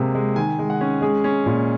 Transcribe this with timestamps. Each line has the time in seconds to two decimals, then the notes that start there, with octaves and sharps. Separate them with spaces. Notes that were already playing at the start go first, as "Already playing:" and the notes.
Already playing: C3 G#3 A#3
0.15 G#3
0.36 D#3 G#5
0.59 G#3
0.70 F#5
0.81 C#4
1.01 G#3 G#4
1.24 C#4
1.46 A#2